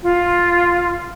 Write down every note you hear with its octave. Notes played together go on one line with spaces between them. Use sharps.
F4